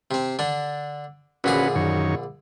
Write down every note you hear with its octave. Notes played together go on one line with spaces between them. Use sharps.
C3 C4
D3 D4
A#1 D3 C#4 F#4 G#4 B4
F#2 D#3 C#5